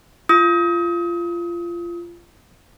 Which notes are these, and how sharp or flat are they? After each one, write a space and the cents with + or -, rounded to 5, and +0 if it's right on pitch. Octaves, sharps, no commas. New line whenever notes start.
F4 -20 D#6 +35